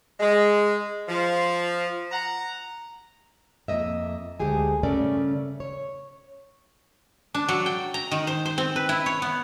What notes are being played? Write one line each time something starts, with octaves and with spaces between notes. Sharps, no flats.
G#3
F3
F#5 A#5
F2 A#3 D#5 E5
D2 G#3 G4 G#4 G#5
G2 C#3 A3 C#4 A#4 D5
C#5
D4
F#3
G5
A#5
D#3
C5
C5
C4
B4
E4
C#5
B3